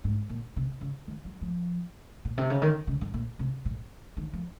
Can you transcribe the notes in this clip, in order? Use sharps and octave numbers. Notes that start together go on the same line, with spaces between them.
G#2
A#2
C3
C#3
D#3
F#3
F3
A#2
C3
C#3
D#3
C#3
G#2
A#2
C3
A#2
D#3
F3